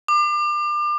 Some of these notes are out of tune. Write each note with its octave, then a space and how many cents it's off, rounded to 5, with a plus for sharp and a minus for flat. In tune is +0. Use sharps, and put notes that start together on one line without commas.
D6 +35